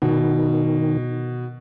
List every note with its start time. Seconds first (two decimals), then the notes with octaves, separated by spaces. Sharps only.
0.02 B2 D#3